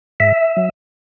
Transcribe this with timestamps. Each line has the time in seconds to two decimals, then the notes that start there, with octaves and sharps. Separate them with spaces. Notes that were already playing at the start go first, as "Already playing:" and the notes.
0.20 G#2 E5
0.57 F#3